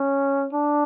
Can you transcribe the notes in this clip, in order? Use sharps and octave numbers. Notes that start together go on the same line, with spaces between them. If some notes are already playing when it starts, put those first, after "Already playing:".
Already playing: C#4
D4